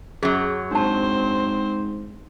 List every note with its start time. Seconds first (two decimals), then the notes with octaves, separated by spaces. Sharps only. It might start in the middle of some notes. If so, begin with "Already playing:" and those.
0.23 F#2 F#3 G#4
0.71 G#2 C4 D4 C5 A5